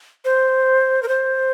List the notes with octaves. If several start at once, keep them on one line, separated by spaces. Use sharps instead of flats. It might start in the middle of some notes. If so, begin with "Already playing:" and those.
C5
A#4
C5